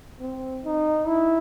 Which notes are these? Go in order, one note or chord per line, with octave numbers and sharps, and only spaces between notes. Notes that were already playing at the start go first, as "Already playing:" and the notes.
C4
D#4
E4